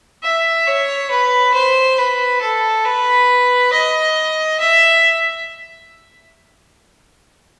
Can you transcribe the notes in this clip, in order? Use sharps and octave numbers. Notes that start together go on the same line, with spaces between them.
E5
C#5
B4
C5
B4
A4
B4
D#5
E5